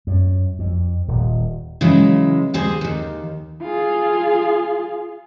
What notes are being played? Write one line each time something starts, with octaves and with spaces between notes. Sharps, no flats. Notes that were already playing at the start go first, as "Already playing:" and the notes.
F#2
F2
D#1
C#3 E3 F#3 G#3
D#2 C4 G#4 C5
D#2 D#3
F4 G#4